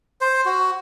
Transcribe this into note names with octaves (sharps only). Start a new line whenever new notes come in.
C5
F#4